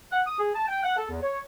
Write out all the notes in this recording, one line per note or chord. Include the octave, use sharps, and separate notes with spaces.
F#5
D#6
G#4
A5
G5
F#5
A4
E2
C#5